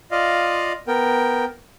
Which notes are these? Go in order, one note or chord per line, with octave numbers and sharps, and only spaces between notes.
F4 D5 D#5 F5
B3 A#4 G5